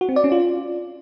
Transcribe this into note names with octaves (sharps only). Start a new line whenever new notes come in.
F#4
C4
D5
C#4
F4